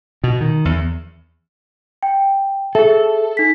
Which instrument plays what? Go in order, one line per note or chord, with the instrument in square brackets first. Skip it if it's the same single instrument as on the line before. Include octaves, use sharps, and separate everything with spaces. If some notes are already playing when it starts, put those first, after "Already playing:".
[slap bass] B2
D#3
E2
[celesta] G5
[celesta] G#4 E5 [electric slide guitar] A4
[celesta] D#4 B6